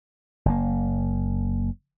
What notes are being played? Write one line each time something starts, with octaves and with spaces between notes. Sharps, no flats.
F#1 A#3